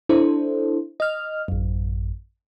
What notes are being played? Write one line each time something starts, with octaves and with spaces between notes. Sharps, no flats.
D4 E4 A4 C5
D#5 F6
A1 F#2